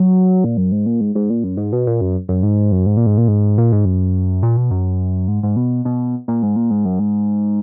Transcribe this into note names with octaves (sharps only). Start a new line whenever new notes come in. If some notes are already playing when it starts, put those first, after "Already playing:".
Already playing: F#3
A#2
F#2
G#2
A#2
G#2
G#2
A#2
F#2
G#2
B2
A#2
F#2
F#2
G#2
F#2
G#2
A#2
G#2
A#2
G#2
A#2
G#2
F#2
A#2
B2
F#2
G#2
G#2
B2
B2
A#2
G#2
A#2
G#2
F#2
G#2